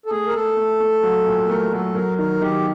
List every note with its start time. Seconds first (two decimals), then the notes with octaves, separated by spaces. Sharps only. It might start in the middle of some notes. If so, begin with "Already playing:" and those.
0.06 A4
0.10 A3 G#4
0.27 A#4
0.33 A3 A4
0.56 A3
0.80 A3
1.03 F#3
1.26 A#2
1.48 A3 A#4
1.72 F#3 A4
1.95 F#3 A#4
2.18 D#3 A#4
2.41 D#3 G4